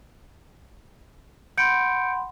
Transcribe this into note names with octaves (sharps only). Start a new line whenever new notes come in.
F#5 B5 C6 G6 C#7 D7